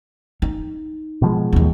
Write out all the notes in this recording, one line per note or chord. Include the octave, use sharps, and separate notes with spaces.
D#4
B2 F3 G#3
D#2 D#4